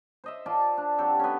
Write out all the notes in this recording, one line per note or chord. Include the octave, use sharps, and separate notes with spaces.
C5 D#5 E5
F4 D5 A5
D4
F#3 C4 G4 A4
B3 C#4